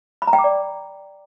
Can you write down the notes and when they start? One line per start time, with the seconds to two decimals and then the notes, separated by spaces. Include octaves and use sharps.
0.22 B5
0.27 A#5
0.33 G5
0.39 D6
0.44 D5